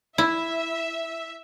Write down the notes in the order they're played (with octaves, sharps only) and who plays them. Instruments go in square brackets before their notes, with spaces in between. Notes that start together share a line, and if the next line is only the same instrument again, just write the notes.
[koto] E4 [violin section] E5